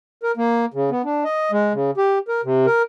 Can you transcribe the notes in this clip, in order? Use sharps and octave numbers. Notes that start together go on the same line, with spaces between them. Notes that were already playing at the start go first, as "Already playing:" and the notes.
A#4
A#3
C#3
B3
D4
D#5
G#3
C#3
G4
A#4
C3
A#4